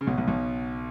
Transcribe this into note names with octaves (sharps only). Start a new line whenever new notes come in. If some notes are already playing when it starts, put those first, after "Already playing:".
C#3
B1 B2
B1 B2
B1 B2